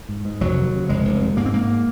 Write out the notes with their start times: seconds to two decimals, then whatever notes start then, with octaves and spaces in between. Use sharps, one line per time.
0.09 G#2
0.25 G#2
0.41 F1 F#3
0.57 D#2
0.73 C#3
0.89 F1 G#3
1.05 F1
1.21 D#2
1.37 G#2 A#3
1.46 C4
1.53 G#2 A#3